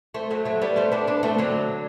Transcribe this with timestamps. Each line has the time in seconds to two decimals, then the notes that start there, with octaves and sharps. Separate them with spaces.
0.14 A3 C4
0.30 F#3 A3
0.45 F#3 A3
0.62 G3 B3
0.76 A3 C4
0.92 B3 D4
1.07 B3 D4
1.23 A3 C4
1.38 D3 F#3